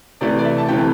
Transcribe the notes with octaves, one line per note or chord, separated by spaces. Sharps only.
C3 E3 A3 D5
D5
E5
A5
C3 E3 A3 G5